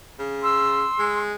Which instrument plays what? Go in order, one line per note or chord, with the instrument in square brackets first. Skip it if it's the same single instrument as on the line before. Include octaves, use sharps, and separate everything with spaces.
[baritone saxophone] C#3
[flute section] C6 E6
[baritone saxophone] G#3